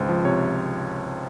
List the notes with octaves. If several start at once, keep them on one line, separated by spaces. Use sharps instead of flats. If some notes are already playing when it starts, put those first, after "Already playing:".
Already playing: G#1 C#2 C5
F3
C3 C#5